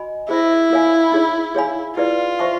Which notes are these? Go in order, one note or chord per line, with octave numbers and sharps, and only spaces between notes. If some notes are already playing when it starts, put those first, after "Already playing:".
Already playing: F#4 D#5 G#5 B5
E4 G#4 C5 E5
F4 A#4 C#5 F5 G#5
D#4 G#4 C#5
G#4 C#5 F5 G#5 B5
E4 F4 G#4 B4 D5
C5 E5 A5 C#6